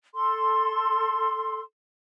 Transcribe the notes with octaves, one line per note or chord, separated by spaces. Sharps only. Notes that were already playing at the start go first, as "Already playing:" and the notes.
A4 C6